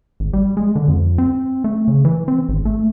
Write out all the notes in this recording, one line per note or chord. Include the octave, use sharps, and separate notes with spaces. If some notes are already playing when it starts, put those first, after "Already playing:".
G#1
G3
G#3
D3
F2
C4
A3
C#3
E3
C4
G#1
A3